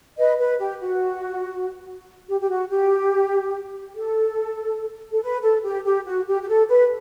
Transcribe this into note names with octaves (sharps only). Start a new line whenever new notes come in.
B4 D#5
B4
G4
F#4
G4
G4
F#4
G4
A4
A4
B4
A4
G4
G4
F#4
G4
G4
A4
B4